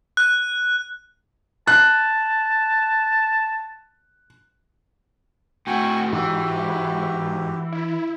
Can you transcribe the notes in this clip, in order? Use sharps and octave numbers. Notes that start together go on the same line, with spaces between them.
F#6
A5 F#6
A2 F#4 G5 G#5 C#6
G#2 E3 F#4 G4
E4